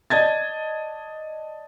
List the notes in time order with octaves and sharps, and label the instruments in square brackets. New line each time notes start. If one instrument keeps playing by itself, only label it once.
[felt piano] D5 D#5 A5 G#6 A6